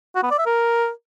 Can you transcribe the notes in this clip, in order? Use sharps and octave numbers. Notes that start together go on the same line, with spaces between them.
F#4
B3
D5
E5
A#4